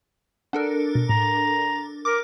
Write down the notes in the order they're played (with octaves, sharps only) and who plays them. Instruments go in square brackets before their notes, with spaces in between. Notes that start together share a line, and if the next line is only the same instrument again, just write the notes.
[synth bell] D4 A4 A#4 [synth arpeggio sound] F#5
[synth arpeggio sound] B2
[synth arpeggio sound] A2 [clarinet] A#5
[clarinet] A#4 [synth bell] D6